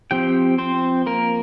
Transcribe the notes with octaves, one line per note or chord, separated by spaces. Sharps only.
F3 C4 G4 G5
C4 C5
A#3 A#4